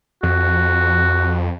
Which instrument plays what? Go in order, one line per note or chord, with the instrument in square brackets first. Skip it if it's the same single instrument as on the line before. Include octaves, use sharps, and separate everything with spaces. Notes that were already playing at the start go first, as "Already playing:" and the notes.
[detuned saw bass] F2 [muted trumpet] F#4